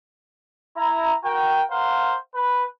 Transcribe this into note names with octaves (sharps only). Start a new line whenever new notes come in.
E4 A#5
F#4 A#4 G5
A#4 C5 F5 F#5
B4